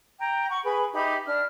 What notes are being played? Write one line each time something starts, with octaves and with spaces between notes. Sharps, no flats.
G5 A#5
F#5 C#6
G#4 B4 B5
D#4 G4 E5 B5
D4 F6